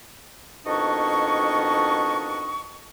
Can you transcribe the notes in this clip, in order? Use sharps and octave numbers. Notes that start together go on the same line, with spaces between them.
F2 B2 D#3 D4 D#5 C#6